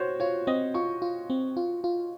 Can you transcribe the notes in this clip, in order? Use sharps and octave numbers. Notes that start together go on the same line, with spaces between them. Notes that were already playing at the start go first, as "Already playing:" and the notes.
Already playing: F#4 C5 C#5
F4 C#5
C4 D#5
F4 C#6
F4
C4
F4
F4